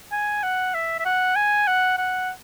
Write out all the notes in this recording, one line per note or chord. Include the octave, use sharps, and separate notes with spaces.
G#5
F#5
E5
E5
F#5
G#5
F#5
F#5